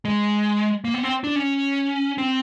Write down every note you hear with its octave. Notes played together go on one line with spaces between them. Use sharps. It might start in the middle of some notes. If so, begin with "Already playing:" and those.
G#3
A#3
B3
C4
D4
C#4
C4